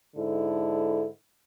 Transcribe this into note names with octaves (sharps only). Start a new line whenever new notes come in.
G#2 D3 E4 A4